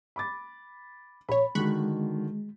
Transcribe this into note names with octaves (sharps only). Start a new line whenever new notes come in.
B5 D6 A6
A#1 C#5 B5
D3 D#3 G#3 F#4 B5 C#6 F#6